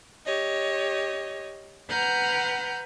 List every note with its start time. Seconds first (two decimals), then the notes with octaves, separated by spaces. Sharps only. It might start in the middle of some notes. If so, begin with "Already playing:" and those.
0.25 G4 C#5 D#5
1.89 B4 F#5 A#5 F6 G6